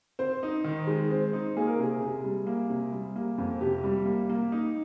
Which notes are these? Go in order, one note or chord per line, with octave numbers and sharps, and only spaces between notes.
C4 C5
D#4
D#3
G#3
C4
D#4
A#3 G#4
A#4
C3 G#4
C3
G3
A#3
C3
G3
A#3
F2
C3 G4
G3
A#3
A#3
D#4